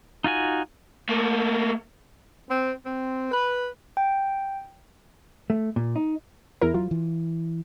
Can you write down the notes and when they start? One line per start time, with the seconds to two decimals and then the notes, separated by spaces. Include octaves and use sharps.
0.24 D#4 F4 F#4 G#5
1.09 A3 A#3
2.50 C4
2.86 C4
3.32 B4
3.97 G5
5.50 A3
5.76 A#2
5.96 D#4
6.61 E2 E4 A#4
6.74 F#3 F4
6.91 E3